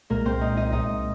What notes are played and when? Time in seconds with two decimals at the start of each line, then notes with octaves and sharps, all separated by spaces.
0.10 C2 A#2 G#3 A#3 A#4
0.25 C4 C5
0.41 D#4 D#5
0.57 D#4 D#5
0.72 C2 A#2 G#3 D#4 D#5